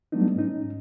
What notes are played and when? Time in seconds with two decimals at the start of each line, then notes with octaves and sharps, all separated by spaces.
0.12 F#3 G3 A3 B3 D4 D#4
0.36 G#2 C#4 D#4